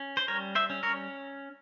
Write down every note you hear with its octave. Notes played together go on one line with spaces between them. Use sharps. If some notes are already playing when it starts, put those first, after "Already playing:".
Already playing: C#4
C5
G3 A#4 C#5
C5 E5
C#4
A#4 C#5